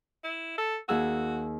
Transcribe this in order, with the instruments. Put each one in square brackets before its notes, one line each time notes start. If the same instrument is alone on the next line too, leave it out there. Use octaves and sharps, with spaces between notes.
[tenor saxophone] E4
A4
[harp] D#2 G#4 E6 [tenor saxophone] F#4